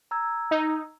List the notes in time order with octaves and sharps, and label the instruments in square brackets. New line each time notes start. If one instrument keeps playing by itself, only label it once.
[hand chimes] A#5 E6 G#6
[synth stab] D#4